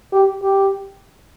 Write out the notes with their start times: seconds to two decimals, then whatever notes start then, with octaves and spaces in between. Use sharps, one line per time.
0.12 G4
0.42 G4